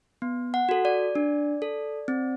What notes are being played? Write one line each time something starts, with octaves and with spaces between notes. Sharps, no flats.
B3
F#5
F#4 A4
D5
D4
A4
C4